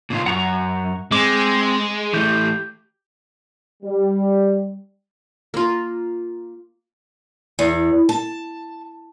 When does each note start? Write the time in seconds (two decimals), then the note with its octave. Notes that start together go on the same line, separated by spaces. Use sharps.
0.10 A#2 C#3 F4
0.26 F#2 F#5 A#5 C#6
1.12 G#3 C4 G#5 D6
2.14 E3 A3 G4 G6
3.83 G3
5.54 A#3 F4
7.59 E2
8.09 A5